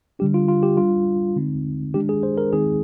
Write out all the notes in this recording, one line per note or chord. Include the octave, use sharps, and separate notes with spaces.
D3 G3 D4 G4
F4
F4
G4
G3 D4 F4
D3 G#3 C4 D#4
D#3 G#3 D4 G4
G#4
C5
A#4
D#3 G#3 C4 D#4 G#4